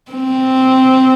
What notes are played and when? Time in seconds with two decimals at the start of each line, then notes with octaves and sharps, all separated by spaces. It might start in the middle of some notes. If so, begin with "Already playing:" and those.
0.12 C4